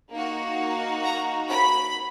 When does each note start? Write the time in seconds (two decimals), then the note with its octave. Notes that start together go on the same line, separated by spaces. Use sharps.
0.12 A#3 D#4 F#4
1.03 A#5
1.50 B5